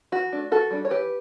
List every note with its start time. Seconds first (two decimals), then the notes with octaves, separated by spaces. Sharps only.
0.12 E3 F#4
0.33 A3 D4
0.51 E3 F#4 A4
0.71 G3 D4
0.85 C#5
0.90 E3 G4 B4